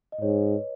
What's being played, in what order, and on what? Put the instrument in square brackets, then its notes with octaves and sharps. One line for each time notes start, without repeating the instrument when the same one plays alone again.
[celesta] D#5
[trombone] G#2 [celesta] C#5
[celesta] B4